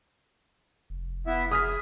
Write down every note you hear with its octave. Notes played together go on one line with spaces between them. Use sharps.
F1
B3 E4 E5
G#4 D#6 F6 B6